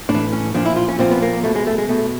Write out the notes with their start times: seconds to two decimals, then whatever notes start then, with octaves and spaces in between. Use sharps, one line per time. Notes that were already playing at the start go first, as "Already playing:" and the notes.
0.09 A2 D4
0.14 E3
0.33 C#4
0.55 A#2 F3 D4
0.65 E4
0.76 F4
0.89 C#4
0.99 A#2 F3 C4
1.11 B3
1.22 A#3
1.44 B2 A3
1.55 G#3
1.67 A3
1.78 G#3
1.89 B2 A3